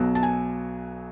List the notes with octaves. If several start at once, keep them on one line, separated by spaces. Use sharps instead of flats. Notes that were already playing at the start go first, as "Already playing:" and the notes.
Already playing: B1 B2 F#3
A5
G#5